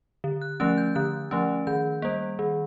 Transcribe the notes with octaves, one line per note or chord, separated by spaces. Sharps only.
D3
F#6
F3 A3 C#4 F#6
G6
D3 F#6
F3 A3 C#4
D#3 G6
G3 A#3
D#3